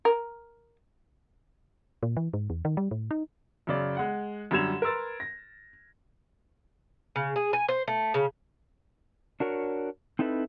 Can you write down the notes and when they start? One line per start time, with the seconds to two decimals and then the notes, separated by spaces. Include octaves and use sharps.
0.05 A#4
2.03 A#2
2.17 E3
2.34 G#2
2.50 E2
2.65 D#3
2.77 G3
2.91 A2
3.11 D#4
3.67 F#2 C#3 D5
3.97 G#3 F#5
4.51 F#2 D3 G3 G#6 E7 F7
4.82 A#4 B4 C6 E6 A6
5.20 A#6
7.16 C#3
7.36 G#4
7.53 G#5
7.68 C5
7.88 A3
8.14 C#3
9.40 D4 F#4 A#4 C#5
10.19 C4 D#4 E4 A4 B4